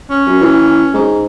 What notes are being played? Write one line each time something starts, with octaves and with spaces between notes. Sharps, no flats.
C#4
F#2
E3
G#2